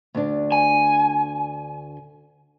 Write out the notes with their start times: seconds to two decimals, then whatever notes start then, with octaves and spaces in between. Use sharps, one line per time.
0.15 D2 D4
0.52 G#5